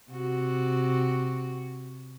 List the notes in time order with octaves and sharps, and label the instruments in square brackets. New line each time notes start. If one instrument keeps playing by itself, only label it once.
[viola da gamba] C3 F#4